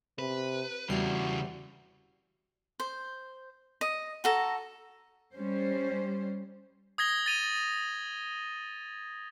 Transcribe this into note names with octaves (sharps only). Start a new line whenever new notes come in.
C3 B4
E2 C#3 G3 E4 F#4 C7
C5
D#5
F#4 A4 A#5
G3 C#4 C5
D#6 G#6 A#6 G7
A6 D#7 F7